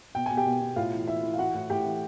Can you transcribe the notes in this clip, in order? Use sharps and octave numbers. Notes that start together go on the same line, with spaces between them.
B2 G5
B2 G#5
G4 G5
B2
B2
A2 F4 F5
E3
E3 E4 E5
E3
F5
E3 F#4 F#5
A2
A2 G4 G5
E3